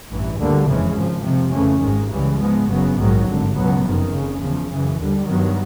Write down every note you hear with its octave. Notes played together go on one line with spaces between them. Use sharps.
A1 G2 E3
D2 D3 G3 A#3
F#1 F2 C#3 E3 G#3
G#1 G#2 F3
F2 C3 F3
F2 C#3 E3 A3 C#4
G#1 G#2 D#3 G#3
C#2 C#3 E3 G3
G#2 F3 G#3 B3
F#1 F#2 C#3 F#3 B3
A#1 G#2 D#3 F#3
G#1 G2 D3
C#2 B2 F#3 B3
F#1 F2 C3 D#3
F#1 F2 C#3
E2 C#3 F3
F#2 C#3 E3
D#2 D3 G3
G2 D#3 F#3 B3